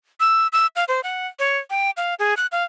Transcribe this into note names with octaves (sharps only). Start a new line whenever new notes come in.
E6
E6
F5
C5
F#5
C#5
G5
F5
G#4
F#6
F5